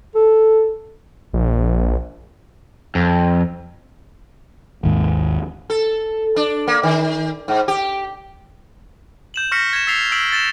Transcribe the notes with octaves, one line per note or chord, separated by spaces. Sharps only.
A4
A#1
F2
G#1 D#2 G#2
A4
D4
A#3
D#3
G#2
G4
G6 E7 F#7
C#6 F6 A#6 B6 C#7
G#6 E7
E6 A6 B6 C7 F7
E6 B6 D7 F#7
A6 E7